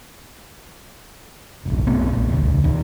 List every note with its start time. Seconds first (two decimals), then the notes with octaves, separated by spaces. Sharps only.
1.65 F1 B1
1.87 B1 A3 B3 C4
2.13 A#1
2.29 E1 D2
2.45 D#1 C#2
2.64 D#1 D#3